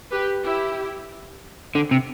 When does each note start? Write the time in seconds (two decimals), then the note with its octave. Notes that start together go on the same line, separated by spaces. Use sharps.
0.12 G4 B4
0.44 E4 G4
1.74 D3 C4
1.91 C3